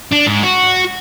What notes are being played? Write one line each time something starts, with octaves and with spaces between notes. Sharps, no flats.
D4
G#2
F#4